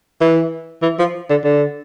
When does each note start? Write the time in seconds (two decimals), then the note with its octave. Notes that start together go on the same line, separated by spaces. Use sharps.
0.21 E3
0.83 E3
0.99 F3
1.30 D3
1.44 D3